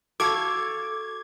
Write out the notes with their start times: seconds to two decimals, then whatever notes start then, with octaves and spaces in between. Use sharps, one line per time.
0.20 F#4 A4 F5 C#6 D6 G#6